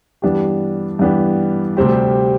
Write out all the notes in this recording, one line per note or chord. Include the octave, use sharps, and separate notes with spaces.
G2 E3 B3 D4 G4
G2 E3 B3 D4 G4
D2 C3 G3 C4 G4